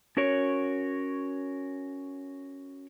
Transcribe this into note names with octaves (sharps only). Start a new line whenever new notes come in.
C#4 F#4 A#4 C#5